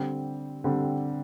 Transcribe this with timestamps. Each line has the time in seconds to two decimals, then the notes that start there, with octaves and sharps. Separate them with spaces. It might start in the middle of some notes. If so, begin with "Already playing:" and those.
Already playing: D3 G3 C4
0.64 D3 G3 C4